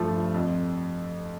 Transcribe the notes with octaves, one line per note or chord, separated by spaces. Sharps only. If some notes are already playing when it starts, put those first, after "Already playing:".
Already playing: G2 F3 A3
F2